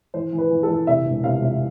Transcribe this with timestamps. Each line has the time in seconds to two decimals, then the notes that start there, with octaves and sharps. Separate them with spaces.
0.14 E3 C5
0.33 E3
0.38 B4
0.50 E3
0.63 A4
0.69 E3
0.87 C3 E5
1.05 E1
1.24 C3 F5
1.42 C3